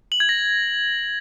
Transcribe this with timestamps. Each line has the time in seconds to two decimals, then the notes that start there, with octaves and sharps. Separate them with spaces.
0.12 F#7
0.20 G#6
0.29 A#6